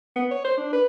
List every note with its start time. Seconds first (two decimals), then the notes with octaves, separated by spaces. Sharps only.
0.16 B3
0.31 C#5
0.45 C5
0.58 D4
0.73 B4